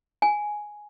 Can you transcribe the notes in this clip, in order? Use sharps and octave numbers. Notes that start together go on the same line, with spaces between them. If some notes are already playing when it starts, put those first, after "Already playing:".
G#5